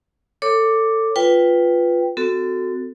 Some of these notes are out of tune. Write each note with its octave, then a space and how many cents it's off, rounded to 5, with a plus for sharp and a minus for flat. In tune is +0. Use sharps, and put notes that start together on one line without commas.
A4 +20 C#5 +0 D6 +0
F4 +5 B4 +0 G5 +0
C4 -35 F#4 +0 A4 +10